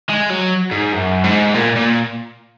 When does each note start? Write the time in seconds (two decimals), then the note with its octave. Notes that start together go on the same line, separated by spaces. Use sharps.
0.09 G#3
0.30 F#3
0.72 G#2
0.93 F#2
1.24 G#2
1.55 A#2
1.76 A#2